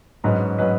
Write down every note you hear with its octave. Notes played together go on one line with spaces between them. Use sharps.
G#2 F#3 C#4 B4 D#5
F#3 C#4 B4 D#5